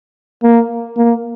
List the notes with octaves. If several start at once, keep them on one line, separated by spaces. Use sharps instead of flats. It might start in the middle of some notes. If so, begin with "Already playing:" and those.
A#3
A#3